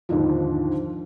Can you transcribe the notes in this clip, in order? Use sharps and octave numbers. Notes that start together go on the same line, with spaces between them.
D#2 G#2 D3 F3